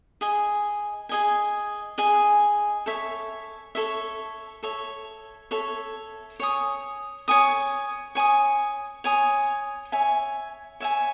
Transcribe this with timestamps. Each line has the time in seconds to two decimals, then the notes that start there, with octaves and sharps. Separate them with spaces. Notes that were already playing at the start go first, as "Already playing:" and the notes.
0.21 G#4 D#5 G#5
1.09 G#4 D#5 G#5
1.98 G#4 D#5 G#5
2.86 A4 C#5 E5
3.75 A4 C#5 E5
4.63 A4 C#5 E5
5.51 A4 C#5 E5
6.40 C#5 G#5 D#6
7.28 C#5 G#5 D#6
8.15 C#5 G#5 D#6
9.04 C#5 G#5 D#6
9.92 C#5 E5 G#5
10.80 C#5 E5 G#5